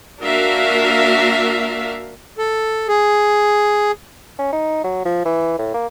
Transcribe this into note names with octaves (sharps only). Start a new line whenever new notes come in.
A#3 D4 F#4 A#4 E5 F5
A4
G#4
C#4
D#4
F#3
F3
E3
A2
A#3